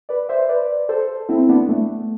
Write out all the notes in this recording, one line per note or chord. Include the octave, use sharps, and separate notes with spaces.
B4 D5
C5 E5
B4 D5
A4 C5
C4 E4
B3 D4
A3